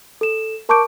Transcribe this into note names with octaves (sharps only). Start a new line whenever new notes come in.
A4 E7
A#4 A5 C#6 D6 G6 D7